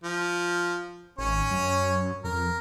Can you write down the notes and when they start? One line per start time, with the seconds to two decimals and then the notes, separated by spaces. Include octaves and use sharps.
0.04 F3
1.19 G#1 C#4 C#5
1.51 F#2
2.24 F2 A#4